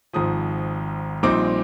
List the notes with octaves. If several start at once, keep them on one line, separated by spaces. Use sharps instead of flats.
G#1 G#2 F3 D#6
A#1 A#2 G3 C4 D#4 D6